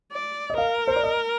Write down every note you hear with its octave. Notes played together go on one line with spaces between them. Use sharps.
D5
D#5
A#4 F5
C5
D5
D#5